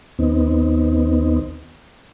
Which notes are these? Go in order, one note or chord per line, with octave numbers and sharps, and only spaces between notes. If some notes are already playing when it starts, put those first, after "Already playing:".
D#2 B3 C4 D#4